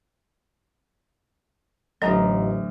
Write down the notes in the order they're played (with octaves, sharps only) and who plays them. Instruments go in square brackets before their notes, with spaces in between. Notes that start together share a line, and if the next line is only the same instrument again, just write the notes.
[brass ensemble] A1 [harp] D2 A2 [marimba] F#3 [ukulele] D#5 A#5